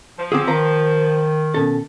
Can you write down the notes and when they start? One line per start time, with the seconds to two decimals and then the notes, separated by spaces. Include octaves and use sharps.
0.18 F3
0.32 D3 C4 F4 G#4 D6 E6
0.47 D#3 B4 F5 A#5
1.54 B2 C#4 A4